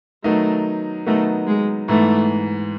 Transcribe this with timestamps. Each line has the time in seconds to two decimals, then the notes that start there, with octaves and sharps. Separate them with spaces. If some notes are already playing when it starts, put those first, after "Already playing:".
0.24 D#3 F#3 A3 B3 D#4
1.06 D#3 F#3 A3 B3 D#4
1.47 G#3
1.88 G#2 E3 A3 B3